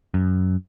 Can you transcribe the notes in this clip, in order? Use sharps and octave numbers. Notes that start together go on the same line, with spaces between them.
F#2